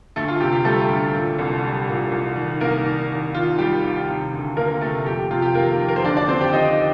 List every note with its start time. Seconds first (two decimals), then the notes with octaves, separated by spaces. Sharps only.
0.16 D2 A3 A4
0.28 F4
0.40 C3 G4
0.53 G4
0.65 G3 A3 A4
0.89 D2
1.14 A#2
1.39 C2
1.63 G3
1.88 A#2
2.12 C2
2.36 D#3
2.60 C2 A#3 A#4
2.85 D#3
3.10 D#2
3.34 D#3 F4
3.58 G3 G4
3.84 D#2
4.08 C3
4.33 D2
4.57 D2 A#3 A#4
4.81 C3 A3 A4
5.06 F2 G4
5.18 G4
5.31 C3 F4
5.42 G4
5.54 D#3 A#3 A#4
5.80 F2
5.89 A#4
5.96 C5
6.04 D3 D4 D5
6.17 D4 D5
6.28 D#2 C4 C5
6.41 G4 G5
6.53 D#2 D#4 D#5